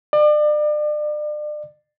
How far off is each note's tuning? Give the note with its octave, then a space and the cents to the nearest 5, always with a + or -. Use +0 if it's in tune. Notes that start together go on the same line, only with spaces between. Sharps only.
D5 +35